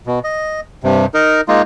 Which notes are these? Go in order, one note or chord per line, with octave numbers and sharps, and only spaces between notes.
B2
D#5
G2 C3
D#4 A#4
G#3 A#3 D#4 F4